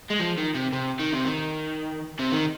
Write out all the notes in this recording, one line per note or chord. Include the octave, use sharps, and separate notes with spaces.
G#3
F3
D#3
C3
C3
D#3
C3
D#3
C3
D#3